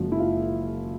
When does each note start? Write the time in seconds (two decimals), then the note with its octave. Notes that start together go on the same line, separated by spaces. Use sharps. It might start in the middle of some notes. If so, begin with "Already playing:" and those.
Already playing: F#1 F#2 C#3 F3 G#3 F#4
0.12 E4
0.19 F4